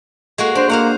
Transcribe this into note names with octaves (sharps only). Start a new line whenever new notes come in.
G#3 A#3 F#4
D4 C5
A#3 C5 F5 F#5